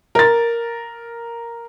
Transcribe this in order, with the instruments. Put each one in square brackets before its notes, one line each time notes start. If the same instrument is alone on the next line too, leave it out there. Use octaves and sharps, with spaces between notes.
[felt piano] A#4 A6